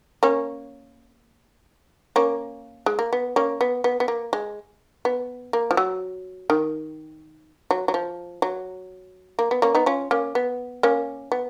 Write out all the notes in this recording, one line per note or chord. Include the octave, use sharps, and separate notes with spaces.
A#3 C#4
A#3 C#4
G#3
A#3
B3
A#3 C#4
B3
B3
B3
A#3
G#3
B3
A#3
F3
F#3
D#3
F#3
F#3
F3
F#3
A#3
B3
A#3 C#4
B3 D#4
C#4 F4
A#3 C#4
B3
A#3 C#4
B3